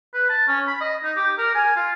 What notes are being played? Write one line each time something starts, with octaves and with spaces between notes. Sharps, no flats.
B4
A5
C#4
B5
D#5
D#4
G4
A#4
G#5
F4